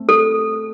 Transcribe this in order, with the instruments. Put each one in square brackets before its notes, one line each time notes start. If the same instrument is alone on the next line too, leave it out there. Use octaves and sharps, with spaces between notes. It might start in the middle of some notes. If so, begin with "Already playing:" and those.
Already playing: [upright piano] A3 C4
[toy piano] A4